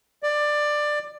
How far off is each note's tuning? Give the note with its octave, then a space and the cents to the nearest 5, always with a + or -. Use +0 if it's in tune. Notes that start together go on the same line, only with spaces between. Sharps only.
D5 +15